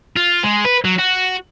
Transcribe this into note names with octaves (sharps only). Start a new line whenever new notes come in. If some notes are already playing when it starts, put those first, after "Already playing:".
F4
G#3
B4
F#3
F#4